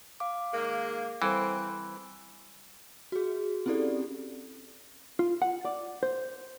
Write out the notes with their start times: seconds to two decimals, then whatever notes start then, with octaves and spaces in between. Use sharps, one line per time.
0.20 F5 D6
0.53 D#3 G#3 A#3
1.22 E3 G3 C4 A4 C5
3.12 F#4 G#4
3.66 C4 C#4 E4 G4 A4 D5
5.19 F4
5.42 F#5
5.65 D5
6.03 C5